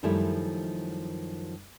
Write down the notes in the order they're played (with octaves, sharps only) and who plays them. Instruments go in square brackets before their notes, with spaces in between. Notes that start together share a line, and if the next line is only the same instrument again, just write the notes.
[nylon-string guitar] F#2 D#3 F3 G3 A3 E4